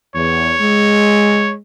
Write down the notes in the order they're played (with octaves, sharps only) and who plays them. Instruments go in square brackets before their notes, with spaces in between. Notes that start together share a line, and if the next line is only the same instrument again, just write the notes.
[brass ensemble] E2 [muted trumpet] C#5
[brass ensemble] G#3